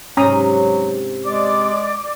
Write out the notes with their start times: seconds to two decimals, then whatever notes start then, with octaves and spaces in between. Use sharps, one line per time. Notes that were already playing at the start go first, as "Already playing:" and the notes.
0.17 G#2 C3 F#3 C#4 A#5 D#6
1.24 G#3 D5 D6